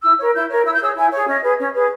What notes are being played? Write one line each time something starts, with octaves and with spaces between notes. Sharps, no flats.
E4 E6
A#4 C#5
E4 G6
A#4 C#5
E4 E6
G6
G#4 C#5 E6
E4 G#5
G#4 C#5
C#4 D#5
G#4 B4
C#4
G#4 B4